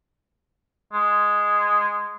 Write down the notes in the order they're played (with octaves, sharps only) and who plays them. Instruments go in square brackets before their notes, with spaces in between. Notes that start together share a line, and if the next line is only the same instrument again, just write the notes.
[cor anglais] G#3